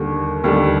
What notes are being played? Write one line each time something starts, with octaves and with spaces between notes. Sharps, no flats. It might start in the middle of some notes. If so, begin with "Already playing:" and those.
Already playing: D#2 D3 G3
D#2 D3 G3